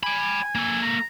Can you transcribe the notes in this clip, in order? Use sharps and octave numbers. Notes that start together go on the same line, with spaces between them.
G5 G#5 B5
A#3 A4
A#5